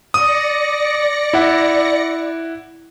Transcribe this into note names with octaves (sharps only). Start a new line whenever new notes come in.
D5 D#6 A#6 C#7
E4 F#5